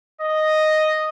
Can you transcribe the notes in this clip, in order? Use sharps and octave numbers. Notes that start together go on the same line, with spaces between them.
D#5